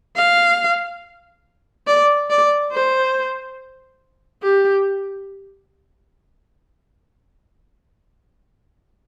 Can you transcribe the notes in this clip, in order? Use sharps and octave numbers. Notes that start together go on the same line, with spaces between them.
F5
D5
D5
C5
G4